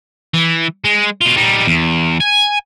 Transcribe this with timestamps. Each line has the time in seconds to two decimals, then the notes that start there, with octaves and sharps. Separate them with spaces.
0.34 E3
0.84 G#3
1.21 B2 F4
1.36 G3 D#4
1.67 E2
2.20 G#5